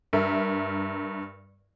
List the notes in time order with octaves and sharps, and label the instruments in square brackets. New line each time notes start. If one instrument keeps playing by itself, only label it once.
[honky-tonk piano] G2 A#4 E5